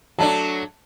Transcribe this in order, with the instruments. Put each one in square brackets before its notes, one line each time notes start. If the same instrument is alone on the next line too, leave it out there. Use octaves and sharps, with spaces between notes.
[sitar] F#3 A3 D4 [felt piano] A5